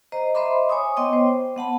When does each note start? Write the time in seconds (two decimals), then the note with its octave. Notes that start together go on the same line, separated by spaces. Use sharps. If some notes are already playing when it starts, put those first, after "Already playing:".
0.12 C5 D#5 A#5
0.35 C5 D#5 E5 B5 C6 D6
0.69 C#5 G#5 C#6 D#6
0.96 B3 C#5 D#5 G5 C6 D6
1.13 C5
1.56 B3 F#5 A5 B5